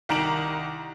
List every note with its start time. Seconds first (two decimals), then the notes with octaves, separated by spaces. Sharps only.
0.09 C2 D#3 A#5 D7 E7 F#7